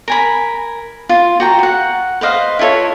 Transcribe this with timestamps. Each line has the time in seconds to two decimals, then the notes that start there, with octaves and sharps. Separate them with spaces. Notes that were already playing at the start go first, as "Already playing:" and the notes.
0.08 A#4 G#5 B5
1.09 F4
1.40 F#4 G5 A#5
1.59 F#4 F#5
2.21 B4 C5 D#5 F5
2.59 E4 F4 A4 C#5